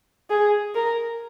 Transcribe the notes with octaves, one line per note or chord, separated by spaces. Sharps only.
G#4
A#4